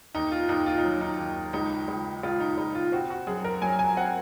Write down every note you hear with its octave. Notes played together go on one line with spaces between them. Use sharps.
D#2 D#4
F4
D#2 D#4
F4
D#4
F#3
D#4
D#2
C#2 D#4
C#2
C#2 F4
D#4
C#2 D#4
F4
C4 F#4
F#4
F#2 G#4
A#4
F#3 G#5
G#5
C4 F#5